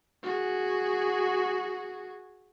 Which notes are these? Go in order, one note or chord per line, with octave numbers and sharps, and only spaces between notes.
F#4 G#4